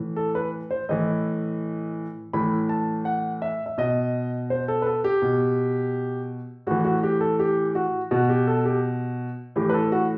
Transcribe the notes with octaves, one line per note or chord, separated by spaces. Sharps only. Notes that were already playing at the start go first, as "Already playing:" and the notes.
Already playing: A2 E3
A4
B4
C5
A2 E3 D#5
A2 E3 B5
A5
F#5
E5
E5
B2 D#5
C5
A4
B4
A4
G4
B2
A2 E3 F#4
F#4
G4
A4
G4
F#4
B2 F#4
G4
A4
G4
A2 E3 G4
B4
A4
F#4